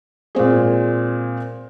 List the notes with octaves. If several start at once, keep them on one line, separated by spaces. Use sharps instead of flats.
A#2 G#3 C4 G#4